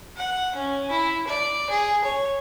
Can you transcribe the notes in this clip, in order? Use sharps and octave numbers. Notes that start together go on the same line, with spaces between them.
F#5
C#4
E4
D5
G#4
C#5